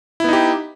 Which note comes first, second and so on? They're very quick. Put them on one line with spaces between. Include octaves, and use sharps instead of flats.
E4 B3 D#4 G4